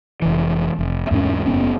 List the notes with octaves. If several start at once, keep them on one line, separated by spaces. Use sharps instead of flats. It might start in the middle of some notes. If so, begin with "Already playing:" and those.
F1 E3
F1
E2 G#2 A#3 C#4
F#1 A#2 B3 C#4